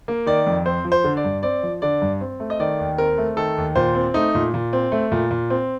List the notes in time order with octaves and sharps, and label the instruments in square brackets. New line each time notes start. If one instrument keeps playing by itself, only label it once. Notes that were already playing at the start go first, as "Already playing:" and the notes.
[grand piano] A#3
D#3 D5
F2
C4 C5
F3
C5
D3
D5
G2
C4 D5
F3
D3 D5
G2
C4
A3
D#5
D#3 D5
D#2
C4 A#4
A3
D#3 A4
D#2
A#2 C5
C4
A3 D#4
A#2
A#2
C4
A3
A#2
A#2
C4